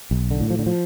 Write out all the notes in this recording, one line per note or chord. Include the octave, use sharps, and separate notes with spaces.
B1
D3
A2
F3
D3
F3